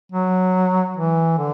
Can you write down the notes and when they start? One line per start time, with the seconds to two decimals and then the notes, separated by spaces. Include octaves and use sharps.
0.12 F#3
0.97 E3
1.38 D3